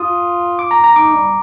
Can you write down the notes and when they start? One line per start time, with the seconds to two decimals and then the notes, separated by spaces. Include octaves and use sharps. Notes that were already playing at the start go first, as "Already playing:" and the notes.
Already playing: F4 D#6
0.59 D6
0.71 A#5
0.84 A#5
0.96 D#4 D6
1.14 G3